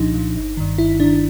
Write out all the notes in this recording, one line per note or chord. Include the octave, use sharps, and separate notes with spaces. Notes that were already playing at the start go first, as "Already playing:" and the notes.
Already playing: C2 A#2 F3 D4 D#4
A#2 F3
G1
G2 D#3
G1 E4
G2 D#3 D4